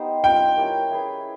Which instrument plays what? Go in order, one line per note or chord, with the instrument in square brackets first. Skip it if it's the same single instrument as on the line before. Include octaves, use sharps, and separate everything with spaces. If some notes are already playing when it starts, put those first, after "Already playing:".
Already playing: [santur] B3 D#4 G4 C5
[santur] G3 C4 F4 [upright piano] G5
[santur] C#4 E4 G4 A#4
E4 G#4 B4